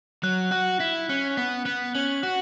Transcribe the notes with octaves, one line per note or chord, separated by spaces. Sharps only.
F#3 F#6
F#4 F#6
E4 B6
C#4 F#6
B3 B6
B3 F#6
C#4 F#7
F#4 F#6